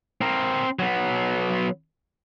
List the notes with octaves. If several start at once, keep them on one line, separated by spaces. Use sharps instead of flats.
C4 A#4
F#3 B3